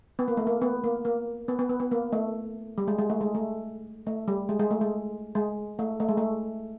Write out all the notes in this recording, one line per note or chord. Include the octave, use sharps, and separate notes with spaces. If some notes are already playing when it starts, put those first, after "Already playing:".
B3
A#3
A3
A#3
B3
A#3
A#3
B3
B3
B3
B3
A#3
A3
G3
G#3
G#3
A3
G#3
A3
A3
G3
G#3
G#3
A3
G#3
G#3
A3
A3
G#3
A3